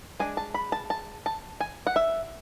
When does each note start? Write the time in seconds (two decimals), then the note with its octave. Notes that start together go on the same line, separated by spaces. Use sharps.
0.20 G#3 D4 G#5
0.37 A5
0.54 B5
0.72 A5
0.90 A5
1.26 A5
1.61 G#5
1.87 F#5
1.96 E5